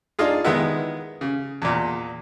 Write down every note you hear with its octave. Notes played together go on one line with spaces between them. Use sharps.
D4 D#4 F4 G#4
D#3 G#3 B3 E4
C#3
E2 A#2